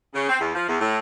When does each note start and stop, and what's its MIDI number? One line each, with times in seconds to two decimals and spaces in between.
0.14 0.25 49
0.28 0.37 60
0.40 0.52 40
0.54 0.65 53
0.67 0.76 40
0.80 0.98 45